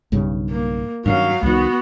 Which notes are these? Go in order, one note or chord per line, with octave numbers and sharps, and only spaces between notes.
B1 G2 C#3
A#3
G2 D#3 F#3 C#4 F5
C2 D#3 B3 F#4